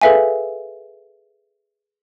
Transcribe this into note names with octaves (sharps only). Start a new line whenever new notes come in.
G#4 A4 B4 E5 F5 G#5